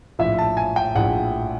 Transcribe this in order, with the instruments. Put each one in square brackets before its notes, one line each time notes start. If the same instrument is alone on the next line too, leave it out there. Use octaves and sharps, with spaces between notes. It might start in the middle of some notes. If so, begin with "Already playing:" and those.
[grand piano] A#1 A2 F3 E5
A5
G#5
G5
A#1 A2 F3 F#5